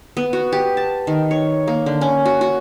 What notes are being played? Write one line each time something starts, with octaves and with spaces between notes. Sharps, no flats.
B3
F#4
G4
A5
D#3
C#5
A#3
D3
C#4
F#4
F#4